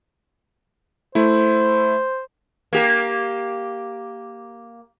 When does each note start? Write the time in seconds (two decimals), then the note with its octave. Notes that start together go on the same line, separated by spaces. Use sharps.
1.15 A3 E4 C5
2.73 A#3 G4